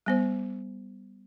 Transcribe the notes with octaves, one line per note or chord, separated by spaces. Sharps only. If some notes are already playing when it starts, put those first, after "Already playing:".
G3 B3 C5